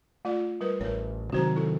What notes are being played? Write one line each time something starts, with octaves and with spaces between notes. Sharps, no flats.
A3 F4 D5
G3 A#4 B4
A1 A#4 C#5
C3 D#3 F#3 F#4 C5 A#5
E4 A4